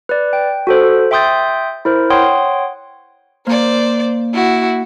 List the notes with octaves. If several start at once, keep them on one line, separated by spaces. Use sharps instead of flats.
B4 D5
G5
F#4 A4 C5
E5 G5 C6 D#6 G6 A6
E4 A#4 C5
C#5 F#5 G5 C6 D#6
A#3 C5 D5
E4 F#4